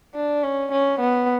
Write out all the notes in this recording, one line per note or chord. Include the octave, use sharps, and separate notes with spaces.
D4
C#4
C#4
B3